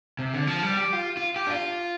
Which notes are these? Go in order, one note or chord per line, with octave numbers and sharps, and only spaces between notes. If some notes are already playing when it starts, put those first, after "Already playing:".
C3
D3
F3
G3
G4
F4
F4
G4
D4
F4